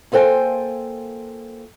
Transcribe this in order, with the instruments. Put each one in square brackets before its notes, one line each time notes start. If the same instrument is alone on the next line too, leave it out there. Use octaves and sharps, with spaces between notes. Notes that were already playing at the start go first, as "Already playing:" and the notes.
[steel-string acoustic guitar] A#3 F4 A4 C5 G5 G#5